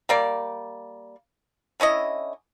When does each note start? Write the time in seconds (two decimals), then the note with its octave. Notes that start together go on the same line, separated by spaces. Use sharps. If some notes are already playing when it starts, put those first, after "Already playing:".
0.09 G3 A#3 D5
1.80 D3 C#4 E4 D#5